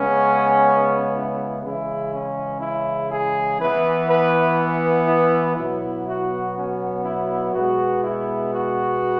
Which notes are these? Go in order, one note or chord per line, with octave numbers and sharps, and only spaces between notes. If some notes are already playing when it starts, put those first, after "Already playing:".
Already playing: C#3 G#3 B3 C#4
E4
C#3 E3 G#3 E4
C#4
E4
G#4
E3 B3 B4
B4
E4
B2 F#3 B3 E4
F#4
C#4
E4
B2 G#3 B3 F#4
E4
F#4